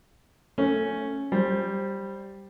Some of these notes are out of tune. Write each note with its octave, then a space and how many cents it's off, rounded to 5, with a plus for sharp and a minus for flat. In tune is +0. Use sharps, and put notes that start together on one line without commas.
A3 +10 C#4 +0
G3 +0 C5 +15